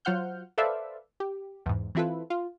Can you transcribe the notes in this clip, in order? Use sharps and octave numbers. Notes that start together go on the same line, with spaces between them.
F#3 F4 C5 F#5 F6 G6
A4 B4 C5 D5 E5 F5
G4
E2 G#2
E3 C4 E4 F4 A4 B4
F4